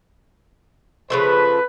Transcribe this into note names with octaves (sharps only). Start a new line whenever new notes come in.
C#3 F3 A3 B4